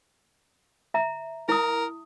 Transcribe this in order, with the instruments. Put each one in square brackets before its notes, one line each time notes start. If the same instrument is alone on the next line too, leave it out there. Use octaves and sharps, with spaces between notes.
[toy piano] E5 A#5
[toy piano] E4 D#6 [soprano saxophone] A#4